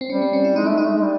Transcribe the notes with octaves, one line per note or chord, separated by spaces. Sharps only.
C4
G3 C#4
C4
C#4
E4
G#3 D#4
A3 D4
G#3 D#4
A3
G#3
G3